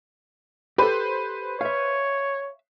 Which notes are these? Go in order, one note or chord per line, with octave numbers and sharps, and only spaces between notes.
G4 A4 B4 C5 B5
C#5 E5 F5